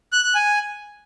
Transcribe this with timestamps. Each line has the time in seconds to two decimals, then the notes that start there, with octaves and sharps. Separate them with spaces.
0.13 F#6
0.24 F#6
0.35 G#5